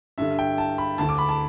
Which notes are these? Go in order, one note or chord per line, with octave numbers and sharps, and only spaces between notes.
G2 D3 E5
G5
A5
B5
D2 D3 A5
D6
B5
A5